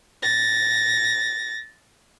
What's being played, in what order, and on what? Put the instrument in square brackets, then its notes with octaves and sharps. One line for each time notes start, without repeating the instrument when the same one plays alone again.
[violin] A6 A#6